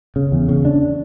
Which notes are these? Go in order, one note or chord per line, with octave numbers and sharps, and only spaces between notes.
C#3
E2
C#3
D4